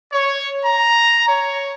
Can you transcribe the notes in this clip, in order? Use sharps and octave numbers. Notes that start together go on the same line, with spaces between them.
C#5
A#5
C#5